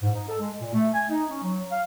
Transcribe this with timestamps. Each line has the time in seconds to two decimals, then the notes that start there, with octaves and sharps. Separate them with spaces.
0.02 G#2
0.15 D#4
0.28 A4
0.40 G#3
0.61 A#2
0.74 A3
0.94 G#5
1.09 D#4
1.30 C#4
1.43 F#3
1.72 F5